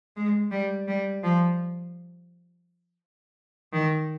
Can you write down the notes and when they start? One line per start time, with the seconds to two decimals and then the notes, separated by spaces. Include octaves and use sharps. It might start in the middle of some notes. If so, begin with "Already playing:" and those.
0.16 G#3
0.51 G3
0.88 G3
1.23 F3
3.73 D#3